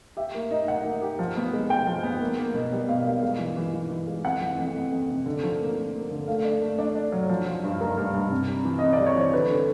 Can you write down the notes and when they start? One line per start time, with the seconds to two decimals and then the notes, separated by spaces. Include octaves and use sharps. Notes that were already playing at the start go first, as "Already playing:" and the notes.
0.17 G4 E5
0.34 A#3
0.51 D#4
0.68 D#4 F#5
0.85 A#3
1.01 G4
1.19 F3
1.37 B3
1.53 G#3
1.70 G#3 G5
1.87 F3
2.03 B3
2.20 A#3
2.38 A#3
2.54 B2
2.72 G3
2.89 B2 F5
3.05 A#3 F5
3.22 G#3 F5
3.39 E3
3.57 E3
3.74 E3
3.90 E3
4.07 G#3
4.24 F2 F#5
4.41 E3
4.58 F2
4.75 F2
4.92 F2
5.10 C3
5.26 D3
5.43 F3
5.61 A#3
5.77 A#3
5.93 A#3
6.11 D3
6.28 A3 F5
6.44 D4
6.62 A3
6.78 D4 D5
6.95 D4
7.12 F#3
7.29 F3
7.46 F3
7.64 G2
7.81 G2 A#4
7.97 G2
8.14 G2
8.31 C3
8.48 G3
8.65 E3
8.79 C3 D#5
8.93 D5
8.99 G3
9.07 C#5
9.16 E3 C5
9.33 D3 B4
9.50 D3